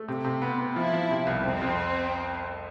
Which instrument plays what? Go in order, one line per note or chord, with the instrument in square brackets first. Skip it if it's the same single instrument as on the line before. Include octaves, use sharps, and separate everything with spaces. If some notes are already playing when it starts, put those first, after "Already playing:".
Already playing: [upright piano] A3
C3
C3
B3
B3
[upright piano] F3 [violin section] E4
[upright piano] F3
C3
C2
[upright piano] F2 [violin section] C4
[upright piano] F2